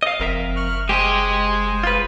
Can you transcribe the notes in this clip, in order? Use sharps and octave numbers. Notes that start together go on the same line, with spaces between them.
D#5 F5
F#1 F2 A#4 E5
C#6 F6 F#6
G#3 G4 G#4 C5 D#5 G#5
F4 B4